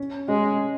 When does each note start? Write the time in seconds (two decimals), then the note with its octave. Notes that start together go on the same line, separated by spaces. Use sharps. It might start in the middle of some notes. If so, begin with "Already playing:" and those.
Already playing: C#4
0.28 G#3 C#4